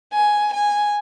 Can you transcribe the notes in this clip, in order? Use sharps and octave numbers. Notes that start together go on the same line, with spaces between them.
G#5
G#5